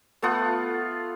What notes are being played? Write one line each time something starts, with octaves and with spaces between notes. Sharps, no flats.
A3 B3 F4 F#5